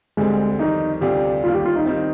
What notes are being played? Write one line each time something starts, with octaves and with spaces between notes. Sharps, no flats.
D2 D3 G3 G#3 C4
F2 D#3 G3 D#4
D2 C3 G3 D4 F4 G4
D#2 D#3 G3 F4
G4
F4
D#4
D#3 G3 C4 D#4